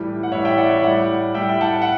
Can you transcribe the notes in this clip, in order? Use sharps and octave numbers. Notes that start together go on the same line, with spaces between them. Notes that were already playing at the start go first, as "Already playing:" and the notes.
Already playing: A2 E3 G3
F#5
A2 E3 G3 C#5 E5
E5 G5
D5 F#5
C#5 E5
A2 G3 D5 F#5
A2 G3 E5 G5
G5
F#5 A5
F#5